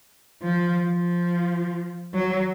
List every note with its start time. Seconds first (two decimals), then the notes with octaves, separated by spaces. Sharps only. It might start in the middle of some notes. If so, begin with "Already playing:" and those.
0.42 F3
0.85 F3
2.14 F#3